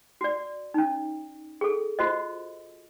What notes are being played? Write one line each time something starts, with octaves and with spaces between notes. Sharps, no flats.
F#4 D5
C#4 D#4
G#4 A4
F4 F#4 C5 D#5